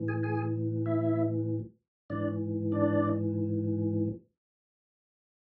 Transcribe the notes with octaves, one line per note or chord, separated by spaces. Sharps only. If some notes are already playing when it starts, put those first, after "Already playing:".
Already playing: A2 E3
G#4 G#5
G#4 G#5
E4 E5
G#2 E3 D4 D5
D4 D5